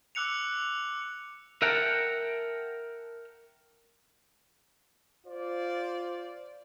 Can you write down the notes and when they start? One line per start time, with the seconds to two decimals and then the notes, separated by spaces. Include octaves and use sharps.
0.15 D6 E6 F#6 C#7 F7
1.62 A#4 E5 F#5 G5 A5 A#5
5.26 F4 C5 D5